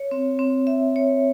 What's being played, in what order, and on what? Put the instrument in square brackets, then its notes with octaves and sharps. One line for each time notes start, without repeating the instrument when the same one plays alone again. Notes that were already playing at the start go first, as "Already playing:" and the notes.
Already playing: [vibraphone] C#5
C4
C4
E5
C#5